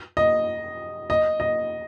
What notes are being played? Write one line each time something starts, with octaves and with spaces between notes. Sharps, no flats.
D#5
D#5
D#5